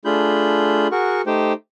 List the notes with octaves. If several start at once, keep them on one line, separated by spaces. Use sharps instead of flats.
A3 D4 F4 G#4 B5 G6
F#4 G#4 A#4 F#5 C#6
A3 D#4 G4 C5 G5